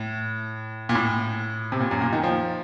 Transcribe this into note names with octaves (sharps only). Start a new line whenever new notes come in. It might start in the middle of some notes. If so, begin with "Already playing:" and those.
Already playing: A2
A#2
A2
C3
A#2
F#2
A#2
D#3
F3